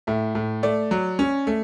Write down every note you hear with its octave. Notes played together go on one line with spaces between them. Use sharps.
A2 E5
A2
A3 D5
F#3
C#4
A3